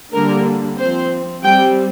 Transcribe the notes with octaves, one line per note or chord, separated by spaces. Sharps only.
D3 G3 A#3 D4 A#4
F3 C4 C5
G3 C4 G5